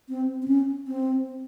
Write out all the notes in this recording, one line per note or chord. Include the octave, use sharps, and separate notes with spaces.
C4
C4
C#4
C4